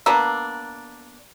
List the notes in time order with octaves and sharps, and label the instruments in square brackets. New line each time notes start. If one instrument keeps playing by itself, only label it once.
[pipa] A#3 B3 D4 [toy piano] A#5 E6